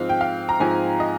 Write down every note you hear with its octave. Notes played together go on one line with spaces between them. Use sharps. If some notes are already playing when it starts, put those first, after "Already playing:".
Already playing: G#2 F3 C4 F5
G5
F5
A#5
G#2 F3 C4 G#5
D#5